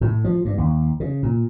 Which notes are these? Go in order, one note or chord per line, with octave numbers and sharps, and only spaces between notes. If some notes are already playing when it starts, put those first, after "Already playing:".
A2
F3
G2
D#2
C#3
A#2